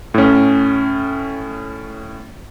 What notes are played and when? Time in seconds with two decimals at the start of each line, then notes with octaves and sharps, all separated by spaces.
0.14 A2 C#4